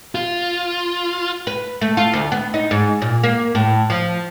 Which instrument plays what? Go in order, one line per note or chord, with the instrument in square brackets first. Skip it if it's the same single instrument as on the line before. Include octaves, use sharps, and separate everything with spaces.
[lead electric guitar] F4
[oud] B4
A3
F4
D2
B3
D#4
G#2
A#2
A#3
A2
F3